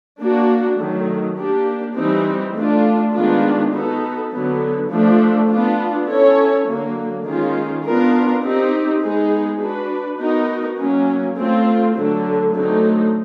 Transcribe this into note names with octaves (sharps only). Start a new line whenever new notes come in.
A#3 D4 F#4
D#3 F#3 A3
A#3 D4 G4
E3 G3 C4 D#4
A3 D4 F4
D#3 G#3 B3 D4 F4
B3 D#4 F#4 A4
D3 F#3 B3
F3 A3 D4
B3 D4 F4
C#4 E4 A4 C#5
D3 F#3 A#3
D#3 G#3 C#4 F4
B3 D4 F4 A#4
C4 D#4 G4
G#3 B3 D#4 G#4
D4 F#4 B4
B3 D#4 F#4 A#4
F#3 A#3 C#4
A3 C4 F4
D3 F#3 A3
D3 F#3 A3 C4 D#4